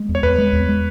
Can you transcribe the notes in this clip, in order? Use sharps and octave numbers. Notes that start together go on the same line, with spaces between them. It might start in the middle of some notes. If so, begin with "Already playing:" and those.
Already playing: G#3
E2
C#5
E2 B4
G#3
E2
G#3